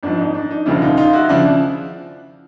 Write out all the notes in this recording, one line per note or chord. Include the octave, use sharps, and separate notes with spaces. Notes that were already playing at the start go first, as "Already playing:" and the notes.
G#1 G#2 F3 D4
D#4
D4
D#4
E1 D2 C#3 F3 D4 E4
D#4 F4
D#4 F4
E4 F#4
C#3 F3 D4 E4